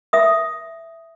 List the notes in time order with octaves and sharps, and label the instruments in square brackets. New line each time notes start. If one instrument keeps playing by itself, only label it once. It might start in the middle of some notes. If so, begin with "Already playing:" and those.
[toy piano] E5 D#6